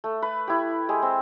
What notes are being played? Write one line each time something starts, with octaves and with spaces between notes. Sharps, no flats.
A3
B4
E4 G4
G#3 G4
C4